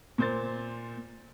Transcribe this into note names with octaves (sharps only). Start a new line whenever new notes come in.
A#2 C5 A6